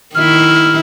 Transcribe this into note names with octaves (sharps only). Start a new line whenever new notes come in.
D#3 E4 F6